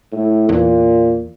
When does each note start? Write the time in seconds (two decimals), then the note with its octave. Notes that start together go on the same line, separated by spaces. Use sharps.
0.12 A2
0.49 E2 A#2